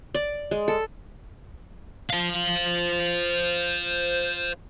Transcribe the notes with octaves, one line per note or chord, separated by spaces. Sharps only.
D5
G#3
A4
C5 F5